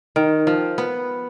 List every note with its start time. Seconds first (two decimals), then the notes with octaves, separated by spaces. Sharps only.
0.16 D#3
0.47 F3
0.78 B3